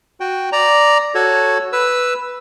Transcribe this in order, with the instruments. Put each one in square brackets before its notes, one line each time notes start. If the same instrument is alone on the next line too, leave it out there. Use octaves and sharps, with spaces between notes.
[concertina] F#4 G5
D5 A#5
F#4 A4 C#5
B4 E6